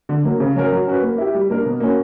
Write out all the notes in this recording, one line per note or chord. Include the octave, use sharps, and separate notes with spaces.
D3
F#3 A#3
C#3
F#3 C#4 F#4 A#4
F#3
C#4 F#4 B4
A#3
E4 G4
G3
A#3 D4 A#4
B2
A#3 C#4 F#4